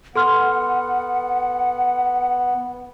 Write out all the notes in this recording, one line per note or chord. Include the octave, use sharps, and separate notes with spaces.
B3 A4 F#5 C6 F6